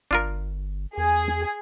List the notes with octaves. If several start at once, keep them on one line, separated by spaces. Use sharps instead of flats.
G1 D4 F4 A#4
E2 G#4